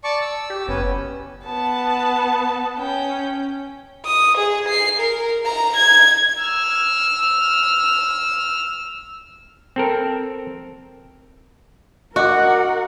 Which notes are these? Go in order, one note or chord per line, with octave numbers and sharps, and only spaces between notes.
D5 A5 C#6
E6
G4
F#1 B3 C#4
B3 A5
C#4 G5
D#6
G#4
C7
A#4
A#5
G#6
E6 F6
C4 A4 A#4
F#4 A#4 D#5 F#5 D6